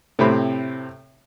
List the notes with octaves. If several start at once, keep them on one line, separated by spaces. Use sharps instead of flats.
A2 C3 C4 B5